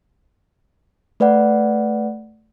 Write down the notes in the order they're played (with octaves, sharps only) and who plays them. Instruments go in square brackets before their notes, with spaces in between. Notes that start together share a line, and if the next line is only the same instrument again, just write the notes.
[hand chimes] A3 B4 D5 F#5